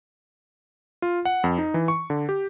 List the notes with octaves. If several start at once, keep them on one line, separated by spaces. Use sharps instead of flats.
F4
F#5
F2
D#4
E3
C#6
D3
G4